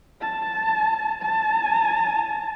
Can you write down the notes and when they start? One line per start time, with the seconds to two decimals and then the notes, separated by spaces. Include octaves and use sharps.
0.21 A5
1.23 A5